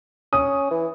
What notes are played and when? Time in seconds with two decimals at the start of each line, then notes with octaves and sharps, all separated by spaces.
0.33 C#4 D#6
0.71 E3